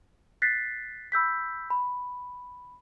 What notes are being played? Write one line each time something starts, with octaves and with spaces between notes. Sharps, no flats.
F#6 A6 B6 C7
B5 E6 G6 B6
B5